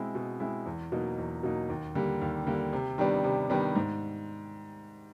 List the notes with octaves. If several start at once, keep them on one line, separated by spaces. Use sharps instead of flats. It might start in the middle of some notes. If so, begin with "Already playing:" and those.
Already playing: B2 G#3 C4 E4
B2
G#3 C4 E4
E2
B2 F#3 A#3 D#4
E2
B2 F#3 A#3 D#4
D#2
D3 G3 A#3
D#2
D3 G3 A#3
C3
D#3 G3 B3 D4
C3
D#3 G3 B3 D4
G#2